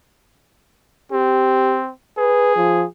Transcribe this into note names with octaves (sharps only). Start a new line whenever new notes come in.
C4 G4
G#4 B4
F3